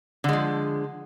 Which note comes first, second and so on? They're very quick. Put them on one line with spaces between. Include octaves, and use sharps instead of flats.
D3 G#3 F3